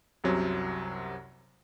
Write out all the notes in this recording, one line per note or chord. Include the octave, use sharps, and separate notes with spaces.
C2 F#2 C3 F#3